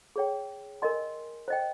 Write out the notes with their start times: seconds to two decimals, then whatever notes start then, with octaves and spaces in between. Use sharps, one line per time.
0.16 G#4 C#5 G5
0.82 A#4 D#5 G#5 C6
1.48 C5 D#5 G5